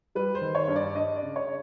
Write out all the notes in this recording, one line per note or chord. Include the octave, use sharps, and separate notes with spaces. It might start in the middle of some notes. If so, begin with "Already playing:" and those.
G3 B4
C5
D#3
C#5
G2
D5
D4 D#5
D5
C#3
C#5